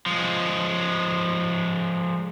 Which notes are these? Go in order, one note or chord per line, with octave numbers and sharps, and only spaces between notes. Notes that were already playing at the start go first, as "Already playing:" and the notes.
F3 G#3